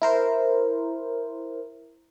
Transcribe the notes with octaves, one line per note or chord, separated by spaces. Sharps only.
E4 A#4 C5